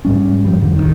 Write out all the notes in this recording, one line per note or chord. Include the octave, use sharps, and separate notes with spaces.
G#2 G3 C#4
G2 F3 G3
F2 D3
D1 G#1 D#3